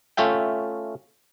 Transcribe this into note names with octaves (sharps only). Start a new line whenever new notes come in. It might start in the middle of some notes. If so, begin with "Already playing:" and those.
A3 C#4 F4 E5 G5